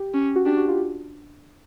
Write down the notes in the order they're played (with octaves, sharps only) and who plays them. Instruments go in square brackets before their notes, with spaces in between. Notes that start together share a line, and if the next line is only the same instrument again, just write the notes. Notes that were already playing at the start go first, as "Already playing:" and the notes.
Already playing: [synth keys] G4
[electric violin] C#4
[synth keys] F#4
[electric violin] D4 [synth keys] G4
[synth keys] F#4
F4